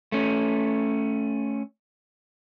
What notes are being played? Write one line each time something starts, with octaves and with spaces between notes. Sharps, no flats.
A3 C#4